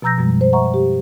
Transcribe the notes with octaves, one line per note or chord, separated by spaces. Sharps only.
B2 F3 A#5 E6 G6 A#6
F#2 B2 F3 G3 G#3
C5
E5 F#5 A#5 C#6
G4